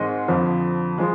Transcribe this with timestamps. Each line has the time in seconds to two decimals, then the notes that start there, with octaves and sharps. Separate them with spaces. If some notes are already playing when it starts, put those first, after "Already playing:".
Already playing: G#2 D#3 G#3 C4 D#5
0.28 F2 D3 F3
0.98 F3 G#3